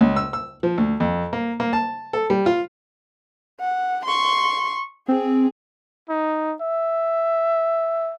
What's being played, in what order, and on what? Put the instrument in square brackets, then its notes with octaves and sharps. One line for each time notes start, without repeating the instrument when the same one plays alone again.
[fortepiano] C#2
E6
E6
F3
D2
F2
A#3
A#3
A5
A4
G3
F4
[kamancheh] F#5
C6 C#6
[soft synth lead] C4 [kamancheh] G#4
[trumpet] D#4
E5